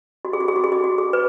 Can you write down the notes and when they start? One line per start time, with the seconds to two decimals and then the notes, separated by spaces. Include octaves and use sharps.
0.25 F#4
0.33 G#4
0.41 F#4
0.48 G#4
0.56 F#4
0.64 G#4
0.72 F#4
0.84 F#4
0.98 G#4
1.13 B4